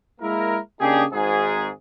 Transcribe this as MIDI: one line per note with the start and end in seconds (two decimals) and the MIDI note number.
0.21 0.58 56
0.21 0.58 58
0.21 0.58 64
0.21 0.58 70
0.80 1.04 49
0.80 1.04 58
0.80 1.04 62
0.80 1.04 63
0.80 1.04 67
0.80 1.04 68
1.12 1.70 32
1.12 1.70 44
1.12 1.70 68